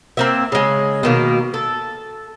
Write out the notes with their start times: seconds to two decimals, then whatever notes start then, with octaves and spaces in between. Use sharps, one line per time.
0.17 A#3 C4 E5
0.52 C#3 G#3
1.03 B2 D#3 A#3
1.54 A4